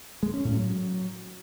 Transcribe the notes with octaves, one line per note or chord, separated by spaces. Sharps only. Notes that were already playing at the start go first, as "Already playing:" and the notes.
G#3
C#4
A2
F#3